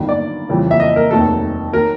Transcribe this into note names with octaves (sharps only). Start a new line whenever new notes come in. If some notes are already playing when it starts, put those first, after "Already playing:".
Already playing: G1 G2 D#3 F#3
D5
F2 C#3 E3 G3
E5
D#5
A#4
F1 D#2 D#3 F#3 A4
D#3 F#3 A#4